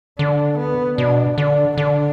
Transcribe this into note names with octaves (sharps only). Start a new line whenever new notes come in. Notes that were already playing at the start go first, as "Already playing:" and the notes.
D3 D4
B3
B2 D4
D3 D4
D3 D4